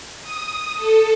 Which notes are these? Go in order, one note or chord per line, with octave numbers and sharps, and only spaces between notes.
D#6
A4